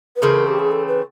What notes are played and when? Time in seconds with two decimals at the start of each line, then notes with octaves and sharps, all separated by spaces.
0.16 B4
0.22 C#3 E3 A3 C4 A#4
0.47 G4
0.59 G#4
0.71 A4
0.88 B4